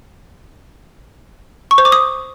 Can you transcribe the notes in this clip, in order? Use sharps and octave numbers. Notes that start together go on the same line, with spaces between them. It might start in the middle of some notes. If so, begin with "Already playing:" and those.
C#6
C5
D6
D#6